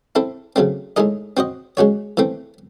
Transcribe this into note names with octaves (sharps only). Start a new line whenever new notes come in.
C4 E4 A4
C#3 F#3 A3 C4
A2 G#3 D#4 G#4 D#5
C4 F#4 C5 D#5
G#3 C#4 F#4 C#5
E3 A3 C4